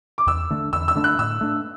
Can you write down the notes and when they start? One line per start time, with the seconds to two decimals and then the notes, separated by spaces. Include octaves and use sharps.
0.18 D6
0.27 E2 E6
0.50 D3 A3 D4
0.73 E2 E6
0.88 E6
0.95 D3 A3 D4
1.04 F#6
1.19 A2 E6
1.41 A3 D4